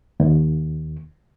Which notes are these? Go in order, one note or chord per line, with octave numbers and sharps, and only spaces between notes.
D#2